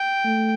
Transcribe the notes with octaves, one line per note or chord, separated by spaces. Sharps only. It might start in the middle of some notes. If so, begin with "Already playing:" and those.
Already playing: G5
A3